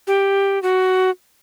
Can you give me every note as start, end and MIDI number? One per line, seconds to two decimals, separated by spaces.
0.07 0.61 67
0.63 1.10 66